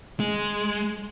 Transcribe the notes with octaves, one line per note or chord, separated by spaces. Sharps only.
G#3